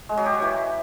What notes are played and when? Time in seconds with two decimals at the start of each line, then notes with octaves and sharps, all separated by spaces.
0.09 G#3
0.17 F#3
0.26 G4
0.34 F#3
0.42 E3